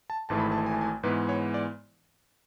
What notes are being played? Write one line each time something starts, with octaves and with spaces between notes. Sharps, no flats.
A5
G#1 G#2 E3 A3 A5
B5
A5
G#5
A5
G#5
G#2 E3 G#3 B3 B4
C#5
D5